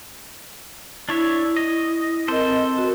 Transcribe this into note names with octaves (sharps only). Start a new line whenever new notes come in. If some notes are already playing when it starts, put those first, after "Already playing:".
D4 E4 C#5 E5
D#5
C4 A4 A#4 C5 D#5
F#4 A#4